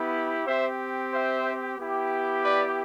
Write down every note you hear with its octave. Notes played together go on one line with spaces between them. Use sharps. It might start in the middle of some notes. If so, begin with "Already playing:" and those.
Already playing: B3 E4 G4
C4 G4 C5 E5
C5 E5
B3 E4 G4
B4 D5